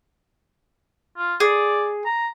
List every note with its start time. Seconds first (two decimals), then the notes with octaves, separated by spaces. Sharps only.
1.17 F4
1.40 G#4 D5
2.05 A#5